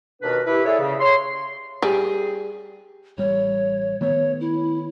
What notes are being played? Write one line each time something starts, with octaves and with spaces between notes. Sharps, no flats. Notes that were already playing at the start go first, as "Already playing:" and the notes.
D#2 B2 D4 A#4 B4
E4 G4 B4
E4 G#4 A4 C#5 D5 E5
C#3
C#5 C6
G3 G#4
A1 G3 C#5
D#3 A3 B3 C#5
E4